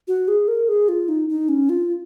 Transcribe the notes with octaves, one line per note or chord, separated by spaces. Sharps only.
F#4
G#4
A#4
G#4
F4
D#4
D#4
C#4
F4